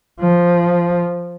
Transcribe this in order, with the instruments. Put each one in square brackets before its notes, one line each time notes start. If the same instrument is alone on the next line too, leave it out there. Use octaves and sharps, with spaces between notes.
[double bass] F3